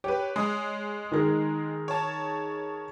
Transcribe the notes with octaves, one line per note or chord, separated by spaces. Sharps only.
G4 B4 C#5
G#3 D#6
D#3 G#4 A#4
C#5 A5